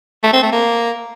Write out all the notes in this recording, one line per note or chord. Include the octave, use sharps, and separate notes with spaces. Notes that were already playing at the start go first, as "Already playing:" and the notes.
A3
C4
A3
A#3